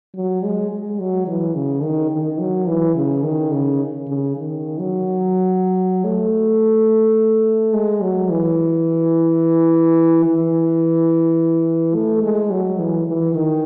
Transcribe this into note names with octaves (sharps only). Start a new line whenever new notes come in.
F#3
G#3
G#3
F#3
E3
C#3
D#3
D#3
F#3
E3
C#3
D#3
C#3
C#3
D#3
F#3
A3
G#3
F#3
E3
E3
A3
G#3
F#3
E3
E3
D#3